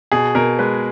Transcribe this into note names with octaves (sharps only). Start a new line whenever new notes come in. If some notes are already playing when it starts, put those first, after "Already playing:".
B2 G#4
B2 A#4
G#3 B4